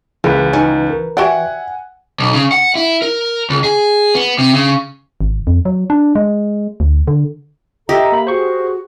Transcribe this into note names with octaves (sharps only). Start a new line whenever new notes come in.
C#2 E3 A#3 G#4 B4
C#4 D#4
A#4
F#4 G4 D5 E5 F#5 G#5
B1
C#3
F#5
E4
A#4
C#2
G#4
B3
C3
C#3
G#1
F2
F#3
D4
G#3
D2
D3
G4 A4 D#5 E5 A#5 E6
A#3 B5
F#4 G#4 C5 C#6